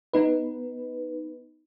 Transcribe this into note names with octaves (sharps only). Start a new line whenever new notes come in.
B3 D#4 B4